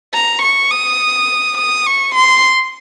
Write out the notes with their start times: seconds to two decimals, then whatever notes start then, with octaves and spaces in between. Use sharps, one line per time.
0.14 A#5
0.42 C#6
0.71 D#6
1.58 D#6
1.86 C#6
2.15 C6